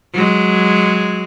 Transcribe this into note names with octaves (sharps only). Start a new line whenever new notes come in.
F#3 G#3